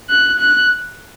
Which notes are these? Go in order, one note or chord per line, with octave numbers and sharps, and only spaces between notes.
F#6
F#6